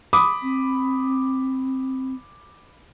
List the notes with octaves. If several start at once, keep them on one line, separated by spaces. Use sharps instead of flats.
B5 D6 D#6
C4